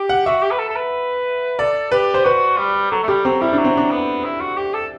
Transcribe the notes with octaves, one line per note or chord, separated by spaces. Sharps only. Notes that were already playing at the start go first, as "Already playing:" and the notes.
Already playing: G4
F#5
F#4 E5
G4
B4
A4
A4
B4
A4 D5
G4 B4
C5
F#4 B4
G3
F#3 A4
A3
G3 G4
F#3 C4
G3 E4
D4
F#3
C4
D4
B3
E4
F#4
G4
A4